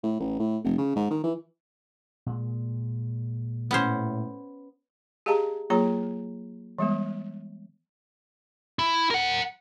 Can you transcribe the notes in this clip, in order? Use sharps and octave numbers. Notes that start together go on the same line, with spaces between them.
A2
A1
A2
F1
C#3
G#2
D#3
E3
A#2 G#3
A2 B3 C#4 C5
G4 G#4 D#5 F5 A5 A#5
F#3 A#3 F4 G#4 C#5 A#5
E3 G3 G#3 B3
E4
A#4 F#5